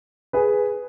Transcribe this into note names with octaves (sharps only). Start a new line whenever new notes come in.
G#4 B4